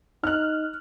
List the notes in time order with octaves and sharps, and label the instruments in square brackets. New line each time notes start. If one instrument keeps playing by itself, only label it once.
[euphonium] D#4 [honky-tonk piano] F6 F#6